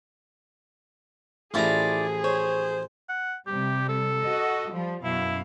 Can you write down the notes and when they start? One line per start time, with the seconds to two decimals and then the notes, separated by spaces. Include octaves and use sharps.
1.54 A1 F3 E4 G#4 D5 A#5 D6
2.24 C5 C#5
3.09 F#5
3.47 C3 G3 G4
3.88 A4
4.23 F#4 D#5
4.70 F3 G3
5.04 F#2 B2 E4 F5